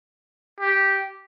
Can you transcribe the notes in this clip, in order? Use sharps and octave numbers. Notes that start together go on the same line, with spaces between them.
G4